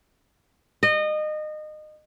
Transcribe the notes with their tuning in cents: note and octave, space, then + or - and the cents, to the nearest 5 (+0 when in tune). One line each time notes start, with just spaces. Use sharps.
D#5 -25